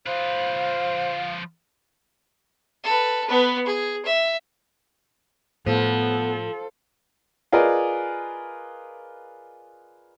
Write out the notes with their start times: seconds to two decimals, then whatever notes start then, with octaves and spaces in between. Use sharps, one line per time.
0.07 F3 B4 C5 F5
2.84 A4 B4
3.27 B3 B4
3.66 G#4
4.05 E5
5.66 A2 F3 B3 A4
7.52 F4 G#4 A#4 B4 D5 D#5